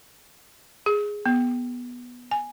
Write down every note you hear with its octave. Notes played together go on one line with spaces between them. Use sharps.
G#4
B3
G#5